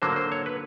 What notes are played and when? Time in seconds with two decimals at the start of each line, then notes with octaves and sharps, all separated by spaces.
0.02 D3 F#3 A#3 C5
0.16 C5
0.32 C#5
0.46 B4